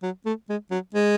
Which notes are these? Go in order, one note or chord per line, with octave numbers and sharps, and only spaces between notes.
F#3
A3
G#3
F#3
G#3